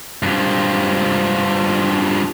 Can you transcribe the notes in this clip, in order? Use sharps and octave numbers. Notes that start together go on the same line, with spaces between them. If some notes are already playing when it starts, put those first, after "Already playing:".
G2 F3